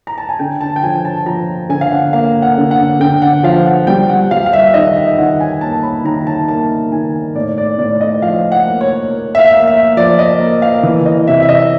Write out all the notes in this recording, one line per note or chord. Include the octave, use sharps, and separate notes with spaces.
A#5
A5
G#5
D3 G5
A5
G5
F3 G#5
A5
F3 A#5
D3 G#5
F5
F#5
A#3 F5
F#5
D3
F#5
D3 G5
F#5
F3 F5
F#5
G3 G5
F#5
G3 F5
F5
E5
D#3 D#5
E5
D#3 F#5
G#5
A#3 A5
B5
D#3 A#5
A5
A#3 A5
D#3 G#5
A2 D5
D5
A2 D5
D#5
F3 F5
F#5
A#3
C#5
A#3
E5
F5
A#3
E5
F3 D5
D#5
A#3
F5
E3
D#5
C3 E5
E5
D#5